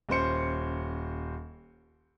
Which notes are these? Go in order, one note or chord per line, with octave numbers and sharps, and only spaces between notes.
D#1 C#4 C5 C#7